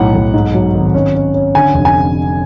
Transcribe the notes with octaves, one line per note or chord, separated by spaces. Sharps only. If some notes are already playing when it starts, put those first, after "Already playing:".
Already playing: B1 A2 F#5
B1
G#2
F#3
G#1
C#4
C#4
C#4
D3 G#5
F1
G#5